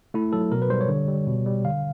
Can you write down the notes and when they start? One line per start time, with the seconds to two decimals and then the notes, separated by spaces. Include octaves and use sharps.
0.14 A3 E4
0.33 F#3 A4
0.52 B2 A#4
0.62 B4
0.70 G3 C5
0.81 C#5
0.89 D3
1.08 G3
1.27 B2
1.46 G3
1.65 D3 F5